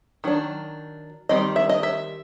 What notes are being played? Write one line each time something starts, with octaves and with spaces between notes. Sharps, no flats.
D#3 F#3 D4
D#3 G3 C4 D#5
E5
D#5
E5